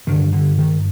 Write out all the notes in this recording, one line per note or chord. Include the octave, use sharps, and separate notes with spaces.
G2 D3 D#3
D3
D#3